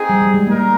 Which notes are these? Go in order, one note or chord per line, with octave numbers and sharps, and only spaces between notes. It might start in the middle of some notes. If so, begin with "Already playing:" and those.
Already playing: C4 D#4 G#4
G3
G3
G#3
A#3 D#4 A#4